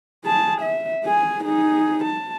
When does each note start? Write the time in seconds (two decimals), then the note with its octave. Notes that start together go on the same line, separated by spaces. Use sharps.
0.25 G#4 A5
0.61 E5
1.05 G#4 G#5
1.44 D#4 G#4
2.04 A5